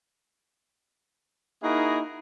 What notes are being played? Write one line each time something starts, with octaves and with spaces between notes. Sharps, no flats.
A#3 D#4 E4 F#4 G#4 A#4